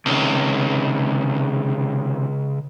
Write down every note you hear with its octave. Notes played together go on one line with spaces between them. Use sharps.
C#2 C3 D#3 C#4